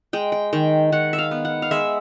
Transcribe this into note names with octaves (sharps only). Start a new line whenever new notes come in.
G#3 G5
G5
D#3 G5
D#3 F#5
E5
F5
B3
F#5
F5
G#3 E5